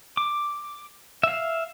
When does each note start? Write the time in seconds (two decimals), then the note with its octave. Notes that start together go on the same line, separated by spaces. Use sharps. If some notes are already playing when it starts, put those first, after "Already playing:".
0.17 D6
1.23 E5 F5